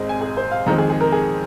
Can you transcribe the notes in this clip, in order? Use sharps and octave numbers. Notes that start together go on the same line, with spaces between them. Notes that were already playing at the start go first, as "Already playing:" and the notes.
Already playing: G#1 G#2 G#3 C4 D#5
G#5
G#4
C5
F5
F2 D#3 G#3 C4 A#5
G#4
G#4
A#4
G#4